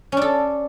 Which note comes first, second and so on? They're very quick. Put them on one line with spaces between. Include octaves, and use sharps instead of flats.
C#4 D4 A4